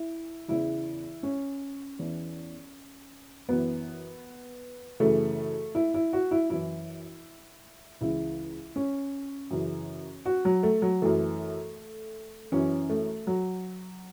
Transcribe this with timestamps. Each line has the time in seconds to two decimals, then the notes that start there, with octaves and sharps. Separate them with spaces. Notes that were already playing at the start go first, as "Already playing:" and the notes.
Already playing: E4
0.48 E2 C#3 E3 E4
1.23 C#4
1.99 E2 E3
3.49 F#2 E3 B3
5.00 F#2 C#3 E3 A3
5.75 E4
5.94 E4
6.13 F#4
6.31 E4
6.50 F#2 E3 E4
8.01 C#2 C#3 E3 E4
8.76 C#4
9.51 F#2 C#3 E3
10.26 F#4
10.45 F#3
10.63 A3
10.82 F#3
11.02 F#2 E3 A3
12.52 F#2 E3 C#4
12.90 A3
13.27 F#3